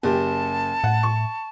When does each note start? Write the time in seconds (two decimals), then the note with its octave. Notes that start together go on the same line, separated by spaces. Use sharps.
0.03 F#1 G4 A5
0.84 A2 F#5
1.03 C#6